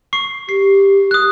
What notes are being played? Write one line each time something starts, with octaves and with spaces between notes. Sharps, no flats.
C#6 C7
G4 C7
D#6 F#6